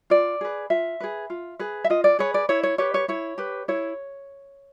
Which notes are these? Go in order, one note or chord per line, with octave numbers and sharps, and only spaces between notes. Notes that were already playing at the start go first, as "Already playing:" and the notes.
F4 D5
G#4 B4
F4 E5
G#4 B4
F4
G#4 B4
E5
F4 D#5
D5
G#4 B4 C#5
D5
E4 C#5
C#5
G4 B4 C#5
C#5
E4 C#5
G4 B4
E4 C#5